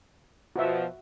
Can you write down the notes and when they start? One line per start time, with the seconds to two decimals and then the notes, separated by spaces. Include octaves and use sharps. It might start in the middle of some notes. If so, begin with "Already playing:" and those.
0.56 B2 F3 F#4 E5